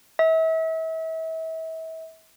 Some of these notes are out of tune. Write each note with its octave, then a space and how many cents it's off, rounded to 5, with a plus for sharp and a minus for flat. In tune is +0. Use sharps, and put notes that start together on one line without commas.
E5 -35